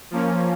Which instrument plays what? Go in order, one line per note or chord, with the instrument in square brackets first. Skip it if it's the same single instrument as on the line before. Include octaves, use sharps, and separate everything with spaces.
[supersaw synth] F3 A#3 C#4